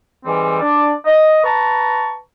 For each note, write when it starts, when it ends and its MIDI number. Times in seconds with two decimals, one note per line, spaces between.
0.25 0.59 44
0.25 0.59 52
0.25 0.59 55
0.25 0.59 60
0.60 0.91 62
0.60 0.91 74
1.05 1.38 75
1.43 2.14 71
1.43 2.14 81
1.43 2.14 82
1.43 2.14 85